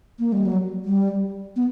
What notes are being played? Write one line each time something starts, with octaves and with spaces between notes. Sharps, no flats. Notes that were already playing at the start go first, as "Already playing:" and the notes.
A#3
G3
F#3
G3
B3